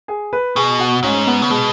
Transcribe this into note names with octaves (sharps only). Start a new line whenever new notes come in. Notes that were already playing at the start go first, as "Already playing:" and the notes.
G#4
B4
B2 G#4
F#4
G#2 C#4
B3
C#3
B2 G#3